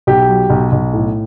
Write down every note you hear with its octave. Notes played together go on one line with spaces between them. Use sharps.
B1 G4
F#3
B1
B1
A2